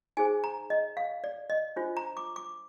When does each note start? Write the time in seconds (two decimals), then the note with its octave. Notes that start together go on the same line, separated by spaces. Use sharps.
0.17 D#4 G#4 C5 G#5
0.44 A#5
0.70 D#5
0.97 F5
1.24 D5
1.50 D#5
1.76 D4 F4 C5
1.97 A#5
2.17 D6
2.36 D6